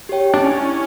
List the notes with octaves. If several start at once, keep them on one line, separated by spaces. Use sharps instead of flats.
G4 C#5 G5
D4
C#4 E4